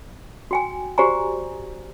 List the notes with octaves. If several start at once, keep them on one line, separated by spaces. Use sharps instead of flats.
F#4 G5 G#5
F#4 G4 C5 D5 G#5 A#5